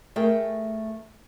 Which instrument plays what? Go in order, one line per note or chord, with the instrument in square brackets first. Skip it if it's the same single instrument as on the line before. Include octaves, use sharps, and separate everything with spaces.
[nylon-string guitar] A3 G#4 A#4 G5